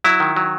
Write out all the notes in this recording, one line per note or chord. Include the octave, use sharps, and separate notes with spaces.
F#3 E4
D#3
F#3